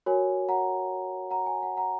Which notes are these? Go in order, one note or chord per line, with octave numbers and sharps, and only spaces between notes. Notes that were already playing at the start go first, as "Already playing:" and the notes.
F#4 A#4 C#5 G#5
F#5 A#5
F#5 A#5
G#5
F#5
F#5 A#5